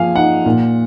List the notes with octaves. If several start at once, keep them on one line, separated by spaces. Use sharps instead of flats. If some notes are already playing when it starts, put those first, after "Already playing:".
Already playing: F3 A#3 F5 G#5
D#4 F#5
A#2